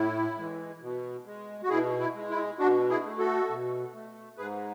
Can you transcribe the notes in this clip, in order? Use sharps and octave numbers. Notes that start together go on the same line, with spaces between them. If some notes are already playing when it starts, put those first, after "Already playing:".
Already playing: A2 E4
E3 G#3
B2
G#3
F#4
B2 E4 G#4
E4
G#3
E4
B2 D4 F#4
E4 G#4
A3
F#4 A4
B2
A3
G#2 G#4 B4